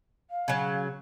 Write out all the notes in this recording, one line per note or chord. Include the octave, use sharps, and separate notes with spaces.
F5
C#3 F#3